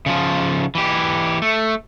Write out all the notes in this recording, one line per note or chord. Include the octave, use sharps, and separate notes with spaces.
C#3 F3
E3 G4
A3